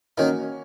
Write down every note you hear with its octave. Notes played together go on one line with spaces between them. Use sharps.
D#3 A#3 C#4 D#4 F#4 A#4 C#5